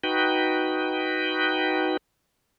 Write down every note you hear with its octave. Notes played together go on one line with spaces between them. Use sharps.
D#4 F#4 B4 G5